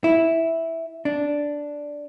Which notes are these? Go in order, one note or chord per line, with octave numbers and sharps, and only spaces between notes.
E4
D4